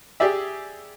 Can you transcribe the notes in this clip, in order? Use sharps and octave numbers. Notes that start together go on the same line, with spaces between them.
G4 G#4 D5 E5